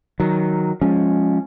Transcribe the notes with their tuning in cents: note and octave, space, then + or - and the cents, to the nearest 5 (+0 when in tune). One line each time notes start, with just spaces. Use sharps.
D#3 +0 F#3 +0
F3 +15 G#3 +0 C#4 +0